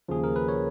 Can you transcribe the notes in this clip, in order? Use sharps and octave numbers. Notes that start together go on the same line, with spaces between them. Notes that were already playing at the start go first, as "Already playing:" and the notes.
D#2 C#3 F3 G#4
A#4
B4
C#5